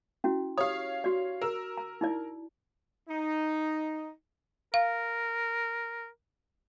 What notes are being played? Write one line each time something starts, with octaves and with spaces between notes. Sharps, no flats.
C#4 E4 F#4
G4 C#5 F5 D#6
F#4 D5
A#4 E6
A#5
D#4 E4 D5
D#4
A#4 F5